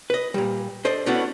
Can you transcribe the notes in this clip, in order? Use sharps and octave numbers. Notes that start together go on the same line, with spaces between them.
B4 D#5
A#2 G3
D4 A4 C5 D#5
A3 B3 C#4 D4 E4 F#4